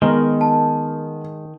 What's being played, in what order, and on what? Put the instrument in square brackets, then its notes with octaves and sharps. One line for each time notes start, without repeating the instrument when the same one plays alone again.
[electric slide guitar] D#3 [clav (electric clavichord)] G#3 A#4 [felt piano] B3
[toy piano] A5